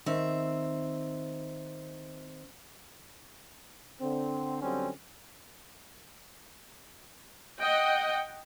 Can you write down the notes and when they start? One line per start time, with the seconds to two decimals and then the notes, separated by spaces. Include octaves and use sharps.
0.06 D#3 C4 E5
4.01 D3 C4
4.62 D3 F#3 G3 C4 C#4
7.59 D#5 F#5 G5